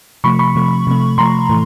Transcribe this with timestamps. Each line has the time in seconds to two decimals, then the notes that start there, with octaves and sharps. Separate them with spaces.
0.24 C3 F3 A3 B5 C#6
0.39 B5 C#6
0.55 C3 F3 A3
0.87 C3 F3 A3
1.18 C3 F3 A3 A#5 C6
1.49 A2 E3 A3